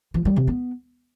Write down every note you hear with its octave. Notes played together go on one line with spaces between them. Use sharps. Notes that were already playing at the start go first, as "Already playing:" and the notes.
F3
G3
C3
B3